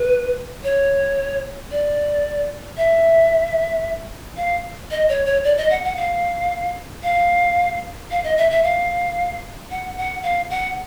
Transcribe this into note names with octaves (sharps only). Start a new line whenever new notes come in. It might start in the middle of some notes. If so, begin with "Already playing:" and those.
Already playing: B4
C#5
D5
E5
F5
D#5
C#5
C#5
D5
D#5
F#5
F#5
F5
F5
F5
D#5
E5
E5
F5
F#5
F#5
F5
F#5